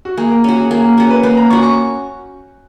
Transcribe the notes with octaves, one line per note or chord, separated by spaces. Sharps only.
F#4
A#3 G#4
A#4
C#4 F#4
G#4
A#3 G#4
G#4
C#4 F#4 A#4
B4
A#3 B4
A#5
C#4 F#4 C#6
C#6